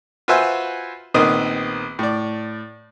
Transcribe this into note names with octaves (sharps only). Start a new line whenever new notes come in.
F4 F#4 B4 C5 E5 G#5
A#1 D#3 B3 C4 C5 D#5
A2 D5